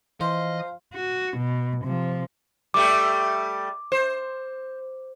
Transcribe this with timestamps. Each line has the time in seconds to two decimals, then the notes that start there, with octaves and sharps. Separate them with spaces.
0.21 E3 F3 C5 D#5 F5
0.94 F#4
1.37 B2
1.84 C3 F3
2.74 G3 A3 G4 D6
3.92 C5